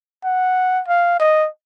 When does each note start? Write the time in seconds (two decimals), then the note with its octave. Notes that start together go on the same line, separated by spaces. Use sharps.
0.24 F#5
0.88 F5
1.20 D#5